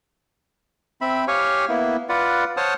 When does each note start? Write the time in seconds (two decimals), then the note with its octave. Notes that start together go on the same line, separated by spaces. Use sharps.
1.01 C4 E5 B5
1.28 G4 C#5 F5 G#5 C#6
1.69 A#3 B3 E4
2.09 F4 B4 D5 F#5
2.57 C5 C#5 F#5 A5 D#6 F6